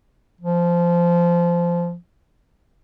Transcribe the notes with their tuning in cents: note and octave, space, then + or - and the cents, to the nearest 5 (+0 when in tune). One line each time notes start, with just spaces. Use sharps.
F3 -15